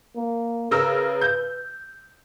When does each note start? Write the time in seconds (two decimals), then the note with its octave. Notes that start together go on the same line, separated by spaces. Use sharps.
0.15 A#3
0.71 C#3 A#4 B4 E6
1.22 G6